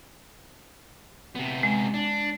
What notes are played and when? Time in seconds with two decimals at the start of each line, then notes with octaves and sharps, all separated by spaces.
1.35 C3 B3
1.63 G#3
1.94 D4